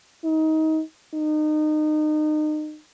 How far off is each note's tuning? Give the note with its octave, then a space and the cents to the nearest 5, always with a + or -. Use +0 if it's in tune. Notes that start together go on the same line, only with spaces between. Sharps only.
D#4 +25
D#4 -30